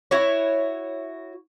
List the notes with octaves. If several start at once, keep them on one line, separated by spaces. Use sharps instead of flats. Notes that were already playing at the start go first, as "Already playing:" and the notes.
E4 F#4 C#5